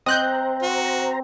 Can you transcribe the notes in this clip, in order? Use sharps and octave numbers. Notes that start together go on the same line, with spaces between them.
C4 C5 D#5 A#5 F#6 G6
F#4